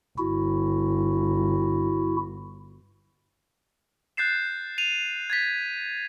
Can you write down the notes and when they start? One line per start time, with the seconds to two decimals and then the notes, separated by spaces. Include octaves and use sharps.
0.18 G1 E4 F#4
4.17 F#6 G6 A6 C7 E7
4.78 D#7 F7
5.30 G#6 A6 B6